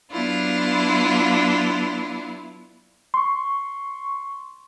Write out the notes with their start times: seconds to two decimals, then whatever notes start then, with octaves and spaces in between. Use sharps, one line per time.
0.11 F#3 B3 D4 E4 F4
3.14 C6 C#6